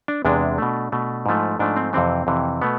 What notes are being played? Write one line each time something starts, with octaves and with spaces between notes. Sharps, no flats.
D4
E2 C3 G#3 D4
B2 A3
B2 A3
G#2 F3 A3
G#2 F3 A3 D4
C4
F2 C3 E3 C4
F2 C3 E3
B2 A3 B3